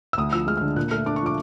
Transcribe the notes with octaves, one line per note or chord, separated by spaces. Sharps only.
E6
D2 D#6
F3 E6
G#3 F6
F6
D3
A#2 F#6
A3 F6
D4 D6
C#6
F3 D6